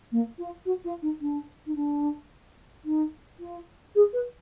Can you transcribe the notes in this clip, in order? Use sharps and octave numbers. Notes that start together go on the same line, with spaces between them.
A#3
F4
F#4
F4
D#4
D4
D#4
D4
D#4
F4
G#4
B4